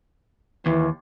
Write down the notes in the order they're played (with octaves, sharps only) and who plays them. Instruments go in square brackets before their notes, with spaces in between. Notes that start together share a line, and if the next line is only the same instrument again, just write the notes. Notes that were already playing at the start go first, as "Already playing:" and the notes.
[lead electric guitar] D#2 [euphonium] E3